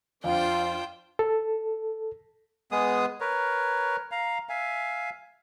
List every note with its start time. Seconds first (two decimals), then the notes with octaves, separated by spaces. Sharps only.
0.24 F2 D4 F4 C5 F5 G5
1.19 A4
2.72 G#3 B3 G#4 D#6
3.20 A#4 B4 C#5
4.11 F5 A#5
4.49 E5 F5 G#5